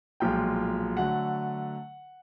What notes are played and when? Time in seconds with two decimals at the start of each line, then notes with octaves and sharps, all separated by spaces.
0.20 B1 A#2 F3 G#3 G5
0.97 D3 F#3 A3 F#5